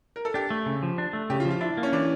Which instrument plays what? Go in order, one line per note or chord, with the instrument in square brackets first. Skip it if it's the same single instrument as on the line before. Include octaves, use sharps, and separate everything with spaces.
[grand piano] A#4
A4
[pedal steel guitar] D4 [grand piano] G4
[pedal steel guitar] A3
C#3
F3
D4
A3
[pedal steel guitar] C#3 [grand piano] G4
[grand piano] F4
[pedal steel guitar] F3
[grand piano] F4
[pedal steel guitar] D4 [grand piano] E4
[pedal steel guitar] A#3
[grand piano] C#4
[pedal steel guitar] E3 [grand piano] D4